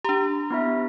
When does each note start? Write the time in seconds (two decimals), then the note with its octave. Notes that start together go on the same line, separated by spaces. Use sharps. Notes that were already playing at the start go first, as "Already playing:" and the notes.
0.05 D4 G4 A#5
0.50 B3 E4 E5